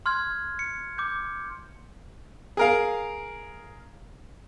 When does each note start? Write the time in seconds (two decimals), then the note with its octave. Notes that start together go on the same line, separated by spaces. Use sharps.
0.06 C6 F6 F#6 G#6
0.59 C#7
0.98 D6 G6
2.57 G#4 A#4 F5